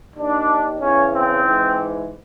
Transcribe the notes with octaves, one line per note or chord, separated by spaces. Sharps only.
D#2 D#3 D4
E2 C#3 E3 C#4
C4
G#2 E3